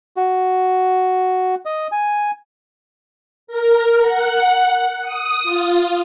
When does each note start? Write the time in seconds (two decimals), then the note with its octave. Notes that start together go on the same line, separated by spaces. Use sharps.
0.17 F#4
1.65 D#5
1.92 G#5
3.47 A#4
4.01 F#5
5.01 D#6
5.43 F4